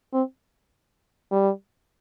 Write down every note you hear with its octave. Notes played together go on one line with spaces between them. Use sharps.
C4
G3